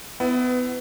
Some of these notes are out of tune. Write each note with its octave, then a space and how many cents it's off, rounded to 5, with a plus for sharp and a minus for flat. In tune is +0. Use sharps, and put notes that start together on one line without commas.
B3 +25 E4 +0